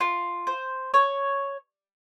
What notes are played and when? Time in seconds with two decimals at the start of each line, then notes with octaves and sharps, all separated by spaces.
0.01 F4
0.47 C5
0.94 C#5